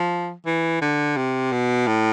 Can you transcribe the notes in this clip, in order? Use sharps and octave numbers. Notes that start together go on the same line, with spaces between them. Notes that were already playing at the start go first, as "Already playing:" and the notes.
Already playing: F3
E3
D3
C3
B2
A2